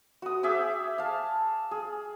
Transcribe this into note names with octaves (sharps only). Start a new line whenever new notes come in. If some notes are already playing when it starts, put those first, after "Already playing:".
F#4 D#6
G#4 E5 G5 D6
F5 A5
G#4